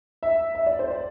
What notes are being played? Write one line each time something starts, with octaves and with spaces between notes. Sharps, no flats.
E5
E5
D5
C5
D5